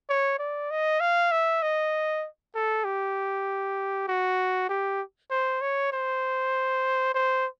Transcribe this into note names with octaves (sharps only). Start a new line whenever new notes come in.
C#5
D5
D#5
F5
E5
D#5
A4
G4
F#4
G4
C5
C#5
C5
C5